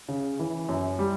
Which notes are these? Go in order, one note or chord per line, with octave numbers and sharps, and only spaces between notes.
C#3
E3
F#2
G3